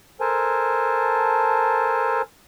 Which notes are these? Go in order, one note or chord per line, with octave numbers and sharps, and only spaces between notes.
A4 A#4 C5 G#5 A5